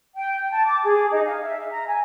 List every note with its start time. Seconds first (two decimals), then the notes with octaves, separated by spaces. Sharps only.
0.16 G5
0.51 A5
0.66 D6
0.84 G#4
1.12 D#4
1.25 F5
1.42 E5
1.71 A#5
1.88 G#5